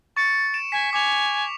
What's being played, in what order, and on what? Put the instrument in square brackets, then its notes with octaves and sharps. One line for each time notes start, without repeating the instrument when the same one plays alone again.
[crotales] C#6 C#7 [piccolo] A6
[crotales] D7 E7
[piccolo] G#5 [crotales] B6
[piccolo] G#5 [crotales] D6 F7